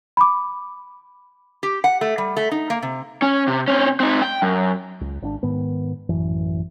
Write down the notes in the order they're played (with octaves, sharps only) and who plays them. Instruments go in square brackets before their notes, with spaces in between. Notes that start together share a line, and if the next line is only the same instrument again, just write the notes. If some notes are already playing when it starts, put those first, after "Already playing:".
[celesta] B5 D6
[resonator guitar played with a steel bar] G4
F#5
A3
G3
A3
D#4
A#3
C3
[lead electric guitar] C#4
C3
C4 C#4
C4 D#4
G5
F#2
[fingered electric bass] C#2
G#1 C4 D4
G#2 D#3 B3
A1 F#2 E3